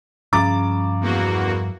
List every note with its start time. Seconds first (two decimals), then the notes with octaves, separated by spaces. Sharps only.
0.33 G2 C#3 F3 A#5 D6 A6
1.01 E2 A#3 F#4